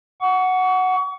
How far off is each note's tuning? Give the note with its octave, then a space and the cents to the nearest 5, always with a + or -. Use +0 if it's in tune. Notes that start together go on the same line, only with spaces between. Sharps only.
F#5 +0 C#6 +35